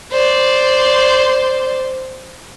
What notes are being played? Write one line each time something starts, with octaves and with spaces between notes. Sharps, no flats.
C5 D5